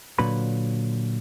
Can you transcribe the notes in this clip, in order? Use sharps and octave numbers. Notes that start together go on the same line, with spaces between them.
A#2 D3 F#3 B4 B5